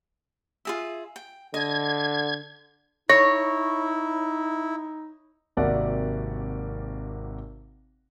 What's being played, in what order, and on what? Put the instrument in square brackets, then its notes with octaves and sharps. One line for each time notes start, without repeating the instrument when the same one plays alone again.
[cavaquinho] F4 G#4 E5
G5
[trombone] D3 [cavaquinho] D#5 [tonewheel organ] G#6
[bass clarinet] D#4 [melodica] E4 [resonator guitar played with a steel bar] C#5 [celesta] A#6
[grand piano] G#1 C3 A#3 F#4 D5 F#5